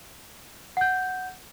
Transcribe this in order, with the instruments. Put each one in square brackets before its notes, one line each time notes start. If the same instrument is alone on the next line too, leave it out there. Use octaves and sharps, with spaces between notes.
[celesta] F#5 G6